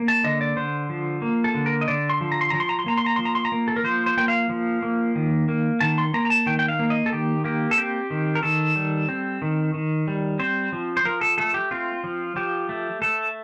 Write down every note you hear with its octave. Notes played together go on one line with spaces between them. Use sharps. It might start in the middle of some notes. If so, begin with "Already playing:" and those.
Already playing: A#3
A5
D3 D#5
D5
D3 C5
F3
A#3
A4
D3
A#4
D#5
D3 D5
C6
F3
A#5
C6
F3 A#5
C6
A#5
C6
A#3 A#5
C6
A#5
F3 C6
A#5
C6
A#5
A#3
A4
A#4
F3 C5
C5
A#3 G5
F5
F3
A#3
D#3
A#3
D#3 A5
C6
A#3 A#5
A#5
A5
D#3 G5
G5
F5
A#3
D#5
A4
D#3 G4
A#3 G4
A4
C4 G4
D#3
A#4
D#3 A4
G3
C4
D#3
D#3
G3
C4 C5
F3
C5
F3 A#4
A4
A3 A4
G4
C4 F4
F3
F3 G4
A3
A3 A4